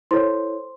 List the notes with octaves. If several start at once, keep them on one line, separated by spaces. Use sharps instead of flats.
E4 A4 C5 C#5 C6